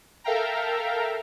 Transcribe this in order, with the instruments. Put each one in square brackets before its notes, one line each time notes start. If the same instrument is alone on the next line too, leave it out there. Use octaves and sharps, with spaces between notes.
[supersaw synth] A4 A#4 E5 F5 G5 A#5